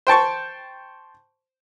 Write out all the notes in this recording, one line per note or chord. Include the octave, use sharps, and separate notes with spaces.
C5 G5 A5 C#6